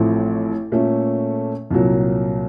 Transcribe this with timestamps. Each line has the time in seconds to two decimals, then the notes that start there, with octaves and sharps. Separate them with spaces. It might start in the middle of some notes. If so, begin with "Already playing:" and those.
Already playing: A1 A2 F3 A3 C4
0.72 A#2 A3 C#4 A4
1.71 C2 A#2 F#3